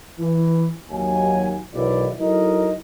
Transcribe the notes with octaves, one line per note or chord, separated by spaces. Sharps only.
E3
D#2 F#3 G#5
B1 E2 B2 D#3 E4 D5
F#3 D#4 E4 A4 A#4 D#5